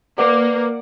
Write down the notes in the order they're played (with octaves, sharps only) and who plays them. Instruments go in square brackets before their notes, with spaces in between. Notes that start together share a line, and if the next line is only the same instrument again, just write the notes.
[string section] A#3 [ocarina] B4 [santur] D5 F#5